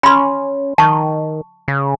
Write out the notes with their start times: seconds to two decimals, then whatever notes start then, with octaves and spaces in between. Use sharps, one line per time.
0.03 C#4 B5 C6
0.78 D#3 A5 C#6
1.68 C#3